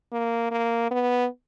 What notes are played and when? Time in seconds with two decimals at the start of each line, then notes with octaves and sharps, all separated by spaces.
0.12 A#3
0.51 A#3
0.91 B3